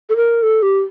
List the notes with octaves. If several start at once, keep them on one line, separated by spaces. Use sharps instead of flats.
A4
A#4
A4
G4